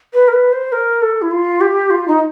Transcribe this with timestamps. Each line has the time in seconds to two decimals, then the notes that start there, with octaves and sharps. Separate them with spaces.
0.13 B4
0.28 A#4
0.33 B4
0.53 C5
0.72 A#4
1.02 A4
1.22 E4
1.31 F4
1.61 G4
1.90 F4
2.08 D#4